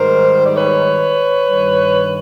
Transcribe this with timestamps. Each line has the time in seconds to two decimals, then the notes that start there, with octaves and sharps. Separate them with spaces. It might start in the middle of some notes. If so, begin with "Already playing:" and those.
Already playing: G#2 D#3 G3 A#4 C5
0.46 D5
0.55 B4 C#5
1.49 G2 D#3 G3